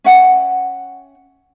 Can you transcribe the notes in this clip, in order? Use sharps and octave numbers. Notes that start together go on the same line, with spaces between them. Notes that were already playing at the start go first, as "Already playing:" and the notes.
C#4 E5 F#5 G5